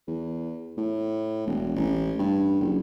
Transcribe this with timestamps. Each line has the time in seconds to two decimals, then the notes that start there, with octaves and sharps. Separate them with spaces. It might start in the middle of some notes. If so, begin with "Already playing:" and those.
0.08 E2
0.77 A2
1.47 E1
1.76 A1
2.19 G2
2.61 F#1